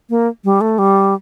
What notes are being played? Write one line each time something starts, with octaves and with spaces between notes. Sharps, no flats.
A#3
G3
A3
G3